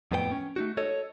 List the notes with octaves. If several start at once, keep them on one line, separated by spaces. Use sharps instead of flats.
F2 A2 B3 A4 G5
C#4
A3 D#4 F#4
A4 C#5 D#5